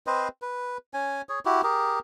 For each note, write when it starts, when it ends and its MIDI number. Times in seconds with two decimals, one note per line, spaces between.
0.07 0.28 60
0.07 0.28 71
0.07 0.28 72
0.07 0.28 75
0.42 0.78 71
0.94 1.22 61
0.94 1.22 80
1.29 1.39 68
1.29 1.39 73
1.45 1.62 64
1.45 1.62 66
1.45 1.62 67
1.63 1.99 67
1.63 1.99 68
1.63 1.99 70